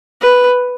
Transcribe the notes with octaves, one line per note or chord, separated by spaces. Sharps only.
B4